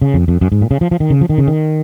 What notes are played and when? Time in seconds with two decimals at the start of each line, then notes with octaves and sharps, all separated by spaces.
0.01 C#3
0.14 F2
0.28 F2
0.41 F#2
0.52 G#2
0.62 A#2
0.71 C#3
0.81 F3
0.91 F3
1.00 D#3
1.10 C#3
1.21 F3
1.29 D#3
1.38 C#3
1.47 D#3